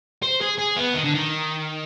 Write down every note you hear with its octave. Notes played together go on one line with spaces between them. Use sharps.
C5
G#4
G#4
B3
D#3
D3
D#3